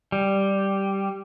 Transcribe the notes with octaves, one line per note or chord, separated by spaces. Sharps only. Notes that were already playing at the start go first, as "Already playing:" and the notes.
G3